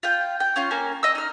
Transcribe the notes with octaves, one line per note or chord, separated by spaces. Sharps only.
F4 G5
G5
C#4 F4 F5
A#3 C#4 G#5
D#5 E6
D#4 F6